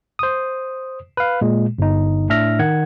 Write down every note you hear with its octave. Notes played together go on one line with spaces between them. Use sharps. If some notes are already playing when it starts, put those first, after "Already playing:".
C5 D#6
B4 F5
A#2 G#3
G1 D#4
A2 D4 E5 F6 A#6
D#3 F#5 G#6